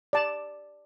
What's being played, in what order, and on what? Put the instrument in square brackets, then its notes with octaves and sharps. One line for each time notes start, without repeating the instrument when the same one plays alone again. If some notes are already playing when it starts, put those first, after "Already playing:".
[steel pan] D5 A5